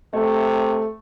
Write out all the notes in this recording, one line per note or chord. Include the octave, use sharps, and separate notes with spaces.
C3 A3